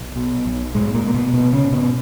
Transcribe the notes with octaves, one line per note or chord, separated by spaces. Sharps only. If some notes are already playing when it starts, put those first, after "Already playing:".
Already playing: B1
B2
B1
G#2 B2 G#3
A#2 A#3
B2
A#3
B2 B3
A#1 B2 B3
C#3 C#4
G#2
B2 B3